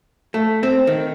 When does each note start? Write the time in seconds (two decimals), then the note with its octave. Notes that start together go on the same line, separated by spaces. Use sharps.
0.34 A3
0.63 C4
0.87 D#3